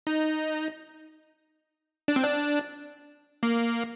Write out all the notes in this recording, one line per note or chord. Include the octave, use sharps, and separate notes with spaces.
D#4
D4
C4
D4
A#3